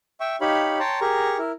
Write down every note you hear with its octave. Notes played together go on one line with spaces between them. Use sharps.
E5 G5 C#6
D#4 G4 C#5 F5 B5
C#5 G5 A5 A#5 C6
G4 G#4 A#4 A#5 C#6
E4 A#4